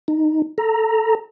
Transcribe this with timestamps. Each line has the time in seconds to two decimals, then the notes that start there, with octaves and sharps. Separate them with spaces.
0.08 D#4
0.58 A4 A#5